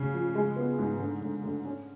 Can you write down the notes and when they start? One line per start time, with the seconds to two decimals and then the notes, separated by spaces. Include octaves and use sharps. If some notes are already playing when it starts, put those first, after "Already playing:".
Already playing: C#3
0.13 F3
0.35 G#3
0.56 B3
0.78 G#2
0.99 D3
1.21 D3
1.44 D3
1.65 C#4